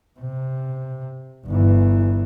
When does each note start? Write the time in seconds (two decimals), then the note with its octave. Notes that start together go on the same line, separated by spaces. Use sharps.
0.20 C3
1.47 G1 E3